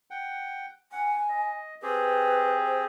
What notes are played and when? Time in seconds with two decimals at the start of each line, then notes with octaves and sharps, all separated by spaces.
0.10 F#5 G5
0.92 F#5 G#5
1.29 D#5
1.82 C4 G4 G#4 B4
2.66 C5